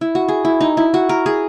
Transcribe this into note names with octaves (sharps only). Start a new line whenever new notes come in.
E4
F#4
G#4
E4
D#4
E4
F#4
A#4
G#4